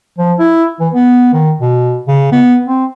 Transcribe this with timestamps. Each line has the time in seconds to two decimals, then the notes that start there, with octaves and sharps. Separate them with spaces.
0.18 F3
0.39 E4
0.80 E3
0.94 B3
1.33 D#3
1.61 B2
2.08 C#3
2.32 B3
2.66 C4